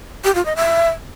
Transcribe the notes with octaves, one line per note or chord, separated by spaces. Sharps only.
G4
F4
D#5
E5